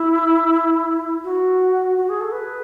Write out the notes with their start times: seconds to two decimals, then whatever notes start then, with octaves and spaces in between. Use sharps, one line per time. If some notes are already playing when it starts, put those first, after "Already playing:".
Already playing: E4
1.24 F#4
1.98 F#4
2.09 G#4
2.21 A4
2.32 B4